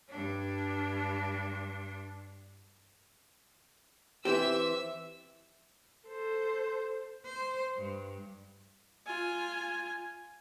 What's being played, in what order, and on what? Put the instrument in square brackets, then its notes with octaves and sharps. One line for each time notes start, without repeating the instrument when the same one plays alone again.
[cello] G2 D4
[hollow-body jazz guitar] E3 C4 G4 [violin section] E5 E6
[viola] A4 C5
[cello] C5
G2
[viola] F4 G#5